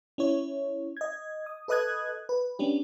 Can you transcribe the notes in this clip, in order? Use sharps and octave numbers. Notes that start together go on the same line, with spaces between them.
C#4 E4 C#5
D#5 G#6
D#6
A4 B4 D#5 D#6 F#6 G#6
B4
B3 C#4 D4 G4